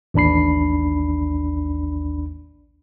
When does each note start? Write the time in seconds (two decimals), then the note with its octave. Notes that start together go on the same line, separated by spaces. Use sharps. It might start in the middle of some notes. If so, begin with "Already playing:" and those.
0.14 A1 D#2 D4 B5 C7